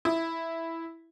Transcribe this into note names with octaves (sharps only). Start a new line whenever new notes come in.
E4